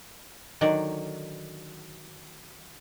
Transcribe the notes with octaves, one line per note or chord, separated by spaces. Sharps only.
D3 D#3 F#3 D5